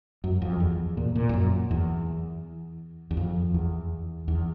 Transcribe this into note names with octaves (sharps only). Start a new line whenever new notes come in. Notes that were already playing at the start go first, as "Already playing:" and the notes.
F#2
F2
E2
A#2
A#2
F2
F#2
E2
E2
F2
E2
E2